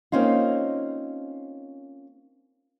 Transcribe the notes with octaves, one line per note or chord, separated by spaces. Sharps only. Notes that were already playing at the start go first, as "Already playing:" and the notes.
A#3 C4 C#4 D#4 F4